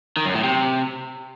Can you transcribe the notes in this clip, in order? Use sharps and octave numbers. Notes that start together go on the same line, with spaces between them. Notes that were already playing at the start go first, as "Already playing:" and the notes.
D#3
F#2
A2
C3